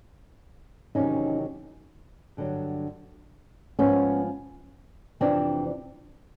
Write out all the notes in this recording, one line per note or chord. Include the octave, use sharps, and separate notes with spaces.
E2 C3 D#3 F#3 C#4 D#4
G2 D3 F#3
G#2 F3 B3 C#4
F2 C3 E3 C4 D4